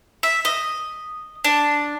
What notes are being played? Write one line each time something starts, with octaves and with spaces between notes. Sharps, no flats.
E5
D#5
D4